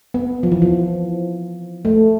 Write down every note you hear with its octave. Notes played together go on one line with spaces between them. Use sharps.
B3
F3
E3
F3
A3